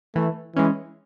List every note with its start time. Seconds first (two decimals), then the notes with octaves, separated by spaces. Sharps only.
0.15 E3 A3
0.56 E3 G#3 C#4